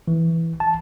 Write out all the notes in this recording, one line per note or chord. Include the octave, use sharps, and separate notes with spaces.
E3
A5